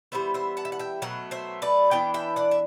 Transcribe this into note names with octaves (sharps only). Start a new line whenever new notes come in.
E3 G3 B3 C5 E5
C5 E5
F#5 A5
E5
F#5
E5 G5
B2 F#3 A3 F#5
C5 E5
B4 D5
E3 B3 D4 G5
E5 G5
D5 F#5
E5